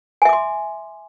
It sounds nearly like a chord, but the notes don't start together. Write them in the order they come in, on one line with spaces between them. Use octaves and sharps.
G#5 E5 D6 C6